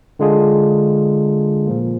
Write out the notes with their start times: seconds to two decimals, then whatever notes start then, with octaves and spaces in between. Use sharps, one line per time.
0.19 D3 G#3 D4 F4 G#4
1.67 A#2 F3 A#3